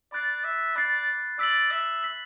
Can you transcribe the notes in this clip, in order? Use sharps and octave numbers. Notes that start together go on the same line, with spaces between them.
D5 B5 F#6 A6 C7
E5
D5 B5 F#6 A6 C7
D5 E6 B6 F#7
E5
E6 B6 F#7